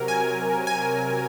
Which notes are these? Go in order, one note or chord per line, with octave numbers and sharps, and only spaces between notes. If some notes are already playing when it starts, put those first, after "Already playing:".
Already playing: C3 F#3 A#4
G#5
G#5